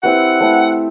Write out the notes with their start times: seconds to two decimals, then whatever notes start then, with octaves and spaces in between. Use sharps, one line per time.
0.03 C4 E4 G4 B4 F#5
0.40 A3 C4 E4